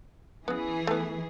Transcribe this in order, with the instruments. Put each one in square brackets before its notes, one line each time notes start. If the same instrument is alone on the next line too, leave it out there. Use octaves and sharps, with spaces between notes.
[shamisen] C#3 B3 [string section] E3 G#4
[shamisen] A3 B3